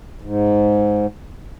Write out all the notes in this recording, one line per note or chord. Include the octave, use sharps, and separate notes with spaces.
G#2